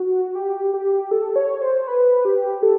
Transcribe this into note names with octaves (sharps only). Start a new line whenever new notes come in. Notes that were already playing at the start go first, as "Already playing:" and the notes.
Already playing: F#4
G4
G4
A4
C#5
C5
B4
G4
A4